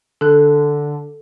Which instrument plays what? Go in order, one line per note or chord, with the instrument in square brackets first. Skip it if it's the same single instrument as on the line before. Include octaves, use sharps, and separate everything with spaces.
[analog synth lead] D3 [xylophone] A4 F#6